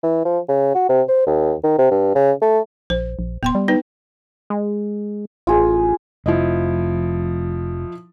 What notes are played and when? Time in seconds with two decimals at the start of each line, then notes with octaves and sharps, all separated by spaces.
0.03 E3
0.25 F3
0.48 C#3
0.74 F#4
0.89 C3
1.08 C5
1.26 D#2
1.63 D#3
1.78 C3
1.91 G2
2.15 C#3
2.42 A3
2.90 A#1 C5
3.19 A#1
3.43 D1 B3 G5 C6
3.55 G3
3.68 B3 D#4 B4
4.50 G#3
5.47 A1 F4 G#4
6.26 F1 F3 E4 D#5